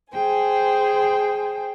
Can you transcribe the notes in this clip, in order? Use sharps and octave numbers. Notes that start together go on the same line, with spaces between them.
G#4 C5 G5 G#5